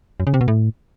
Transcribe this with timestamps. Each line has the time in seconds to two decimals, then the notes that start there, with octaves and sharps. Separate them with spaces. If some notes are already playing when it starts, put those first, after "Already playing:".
0.20 F#2
0.27 C#3
0.34 C3
0.41 B2
0.48 A2